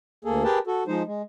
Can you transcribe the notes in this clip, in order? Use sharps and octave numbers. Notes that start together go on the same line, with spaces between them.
D2 A#3 G#4 A4
G4 G#4 A#4 B4 G5 A5
F#4 A4
F3 G#3 D#4 C5
G#3